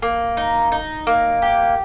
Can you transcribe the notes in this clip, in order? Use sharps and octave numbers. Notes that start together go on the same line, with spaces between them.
A#3
D#4
D#4
A#3
G4